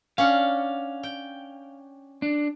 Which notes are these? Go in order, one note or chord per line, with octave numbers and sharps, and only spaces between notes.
C#4 D4 F5 F#5
G5
D4